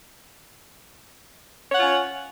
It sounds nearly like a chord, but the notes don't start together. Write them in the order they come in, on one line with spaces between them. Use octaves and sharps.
C#5 F#5 F4 C#4